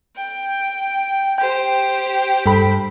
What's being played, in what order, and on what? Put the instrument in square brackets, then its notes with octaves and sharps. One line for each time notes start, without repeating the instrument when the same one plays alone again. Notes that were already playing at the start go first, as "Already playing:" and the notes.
[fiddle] G5
[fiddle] G4 C5 [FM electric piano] G5
[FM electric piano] G2 A4 B5